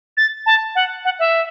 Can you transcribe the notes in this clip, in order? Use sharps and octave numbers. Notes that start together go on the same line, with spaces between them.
A6
A5
F#5
F#5
E5